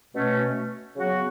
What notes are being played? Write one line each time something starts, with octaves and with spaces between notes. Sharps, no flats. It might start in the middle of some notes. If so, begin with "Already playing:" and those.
B2 A3 C#4
C#3 F#3 B3 F#4